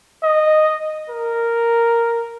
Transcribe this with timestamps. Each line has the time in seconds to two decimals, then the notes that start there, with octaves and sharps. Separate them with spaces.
0.23 D#5
1.10 A#4